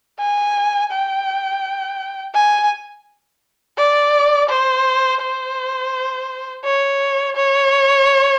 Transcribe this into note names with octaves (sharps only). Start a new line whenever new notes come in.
G#5
G5
G#5
D5
C5
C5
C#5
C#5